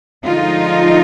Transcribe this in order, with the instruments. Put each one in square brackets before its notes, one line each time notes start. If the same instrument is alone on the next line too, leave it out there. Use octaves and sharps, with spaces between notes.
[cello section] D3 F3 G#3 D#4 F4